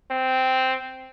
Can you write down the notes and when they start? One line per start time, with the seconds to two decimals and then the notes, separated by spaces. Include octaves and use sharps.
0.11 C4